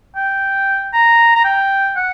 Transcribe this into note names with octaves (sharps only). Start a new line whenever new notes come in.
G5
A#5
A#5
G5
F#5